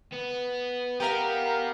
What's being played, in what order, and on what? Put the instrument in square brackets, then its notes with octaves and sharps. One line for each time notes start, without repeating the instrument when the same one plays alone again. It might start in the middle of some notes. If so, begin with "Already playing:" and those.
[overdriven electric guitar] B3
[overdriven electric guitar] B3 [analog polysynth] G4 A#4 F5